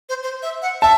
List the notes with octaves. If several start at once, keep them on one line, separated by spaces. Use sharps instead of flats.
C5
C5
E5
F#5
E5 A5